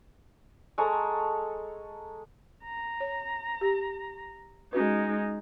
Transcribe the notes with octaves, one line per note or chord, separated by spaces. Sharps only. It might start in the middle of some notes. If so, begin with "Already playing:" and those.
G#3 A4 A#5 C#6
A#5
C#5
G4
G#3 C#4 D#4 F#4 B4